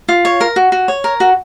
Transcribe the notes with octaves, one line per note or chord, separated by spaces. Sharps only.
F4
C#5
A#4
F#4
F#4
C#5
A#4
F#4